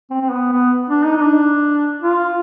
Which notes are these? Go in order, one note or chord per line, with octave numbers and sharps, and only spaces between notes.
C4
C4
B3
B3
D4
D#4
D#4
D4
F4